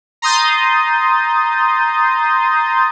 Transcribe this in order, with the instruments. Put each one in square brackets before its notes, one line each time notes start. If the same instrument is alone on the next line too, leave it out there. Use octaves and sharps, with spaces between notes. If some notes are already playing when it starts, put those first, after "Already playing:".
[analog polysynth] A#5 C6 D#6 G6 A6